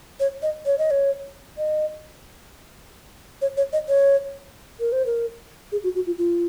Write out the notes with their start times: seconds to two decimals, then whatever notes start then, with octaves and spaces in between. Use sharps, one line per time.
0.20 C#5
0.42 D#5
0.66 C#5
0.78 D#5
0.91 C#5
1.58 D#5
3.42 C#5
3.57 C#5
3.73 D#5
3.89 C#5
4.80 A#4
4.92 C5
5.06 A#4
5.72 G#4
5.84 F#4
5.95 F#4
6.06 F4
6.18 F4